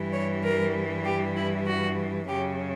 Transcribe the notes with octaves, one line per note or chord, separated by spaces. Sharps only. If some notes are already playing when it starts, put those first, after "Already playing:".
Already playing: G2 E3 G3
C#5
A#4
G4
E4
F#4
F#2 C#3 F#3 G4